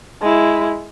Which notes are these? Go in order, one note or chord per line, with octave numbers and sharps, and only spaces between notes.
G#3 E4